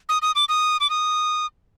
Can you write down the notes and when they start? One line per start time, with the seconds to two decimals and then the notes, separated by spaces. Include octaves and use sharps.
0.09 D#6
0.22 D#6
0.35 D6
0.49 D#6
0.80 D6
0.90 D#6